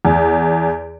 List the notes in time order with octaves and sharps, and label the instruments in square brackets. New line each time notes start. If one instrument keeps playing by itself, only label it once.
[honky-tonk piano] E2